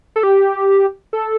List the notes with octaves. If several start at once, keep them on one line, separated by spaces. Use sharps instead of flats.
A4
G4
A4